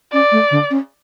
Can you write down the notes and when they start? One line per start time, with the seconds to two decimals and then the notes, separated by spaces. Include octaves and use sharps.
0.13 C#4 D5
0.32 A3
0.51 D3
0.70 C#4